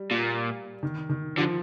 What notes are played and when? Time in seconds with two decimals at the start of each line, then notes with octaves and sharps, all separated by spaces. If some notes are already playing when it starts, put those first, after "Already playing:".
Already playing: G3
0.11 A#2
0.83 D#3
1.10 D#3
1.37 D3 F3